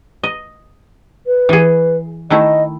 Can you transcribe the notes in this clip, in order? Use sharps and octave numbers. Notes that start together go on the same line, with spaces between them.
D#5
B4
E3 G#4
D#3 A3 E4 D#5